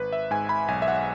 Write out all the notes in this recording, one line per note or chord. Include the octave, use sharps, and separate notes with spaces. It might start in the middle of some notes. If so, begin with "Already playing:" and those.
Already playing: G#1 B4
E5
G#2 G#5
B5
B1 G#5
E5
F#5